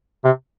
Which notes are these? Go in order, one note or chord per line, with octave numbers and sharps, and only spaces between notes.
C3